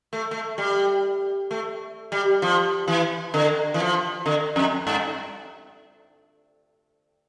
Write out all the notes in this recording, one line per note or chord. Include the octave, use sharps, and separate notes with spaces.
A3
A3
G3
A3
G3
F3
E3
D3
E3
F3
D3
F2
G2